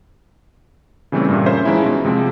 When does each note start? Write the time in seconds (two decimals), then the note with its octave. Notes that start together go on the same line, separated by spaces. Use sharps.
1.12 C#3 E3 G3 A3 C4 C#4
1.29 G2 A#2
1.46 C#4 A#4 C5 E5
1.65 E3 F3 G#3 C#4 D#4 E4
1.86 B2
2.05 C3 F3 G#3 C4